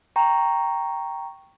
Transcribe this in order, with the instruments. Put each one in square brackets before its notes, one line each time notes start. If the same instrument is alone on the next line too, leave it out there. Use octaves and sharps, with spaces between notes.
[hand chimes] G5 A#5 C#6